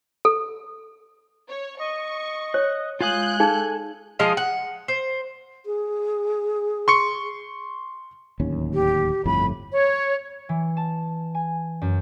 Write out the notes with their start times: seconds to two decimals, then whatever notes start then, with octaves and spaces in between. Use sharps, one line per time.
0.25 A4
1.49 C#5
1.79 D#5 C#6
2.54 C#5 F#6
3.01 G#3 F4 F5 G#5 D#6 F#6 G6
3.40 D#4 G#4 A4 F5
4.19 F3 G#3 D#5 F5
4.37 F#5
4.88 C5
5.66 G#4
6.88 C6 C#6 C#7
8.40 D1 D#2 C#4
8.74 G4
9.25 G1 F2 A2 B5
9.72 C#5
10.49 E3
10.77 A5
11.35 G#5
11.81 F#2